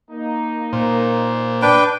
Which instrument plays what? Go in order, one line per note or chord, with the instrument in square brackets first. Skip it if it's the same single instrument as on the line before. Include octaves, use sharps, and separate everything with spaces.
[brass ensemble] A#3 D#4
[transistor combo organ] A#2 C5
[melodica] D4 B4 G5